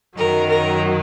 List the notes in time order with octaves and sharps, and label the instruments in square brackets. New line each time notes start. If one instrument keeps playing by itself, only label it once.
[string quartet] F#2 D#3 F#3 A#4
A#4